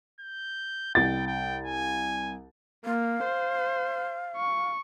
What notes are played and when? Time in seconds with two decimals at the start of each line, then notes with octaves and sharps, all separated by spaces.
0.21 G6
0.95 C2 G5 A6
1.27 G5
1.65 G#5
2.85 A#3 F5
3.24 C5
4.37 C#6